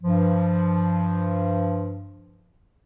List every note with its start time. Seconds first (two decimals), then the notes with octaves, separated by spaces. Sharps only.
0.02 G2 F3